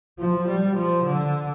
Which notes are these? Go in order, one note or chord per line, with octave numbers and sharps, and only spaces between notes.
F3
G3
F3
D3